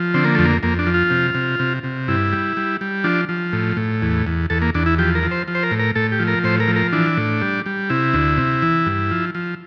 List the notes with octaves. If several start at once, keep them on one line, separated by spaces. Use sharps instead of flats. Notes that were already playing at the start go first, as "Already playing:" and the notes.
Already playing: F3
D3 C4
A#3
F2 A3
A#3
F2 A#3
D4
F3
F4
C3
C3
C3
C3
G2 E4
G3
G3
G3
F3 D4
F3
A2
A2
E2
E2
E2 A4
A#3
E2 D4
E4
F3 G4
A#4
F3
C5
F3
C5
A#4
A2
A#4
A2 A4
G4
F3
A#4
A2 C5
A#4
F3
A#4
E3 D4
A2
G3
G3
C3 E4
D2
C3
E3
G2
F3
F3